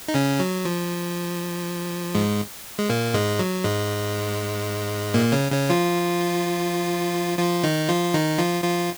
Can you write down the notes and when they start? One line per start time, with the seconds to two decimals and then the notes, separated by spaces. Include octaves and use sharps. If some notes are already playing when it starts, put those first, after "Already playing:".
0.08 D#4
0.14 C#3 C#4
0.39 F#3
0.65 F3
2.15 G#2 G#3
2.79 G#3
2.90 A#2 A#3
3.14 G#2 G#3
3.39 F#3
3.64 G#2 G#3
5.14 A#2 A#3
5.32 C#3 C#4
5.52 C#3 C#4
5.70 F3 F4
7.38 F3 F4
7.63 D#3 D#4
7.89 F3 F4
8.14 D#3 D#4
8.38 F3 F4
8.63 F3 F4